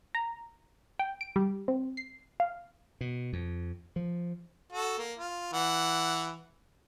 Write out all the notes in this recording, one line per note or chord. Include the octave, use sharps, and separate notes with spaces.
A#5
G5
D7
G3
C4
C7
F5
B2
F2
F3
F#4 A4
A#3
F4
E3 F#5